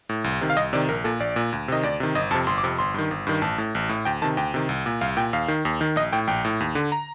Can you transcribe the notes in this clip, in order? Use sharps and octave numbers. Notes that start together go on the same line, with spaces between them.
A2
C2
C3 D#3
F5
C2 D#5
C3 D#3 D5
A#1 A#4
A#2 A4
A#1 D5
A#2
D2
C3 D#3 D#5
D2 D5
C3 D#3
G1 D#5
F2 C3 A5
G1 C6
D6
F2 C3
G1 C6
G2 D#3
G1
G2 D#3
A1 A5
A2
A1
A2
D2 G5
C3 D#3 A5
D2 G5
C3 D#3
C2
A#2
C2 F5
A#2 G5
D#2 F5
D#3
D#2
D#3
A#1 D#5
A2 G5
A#1 G5
A2
D#2
D3
A#5